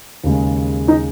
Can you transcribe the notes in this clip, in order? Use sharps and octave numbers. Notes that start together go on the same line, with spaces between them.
D#2 C#3 G#3
D#4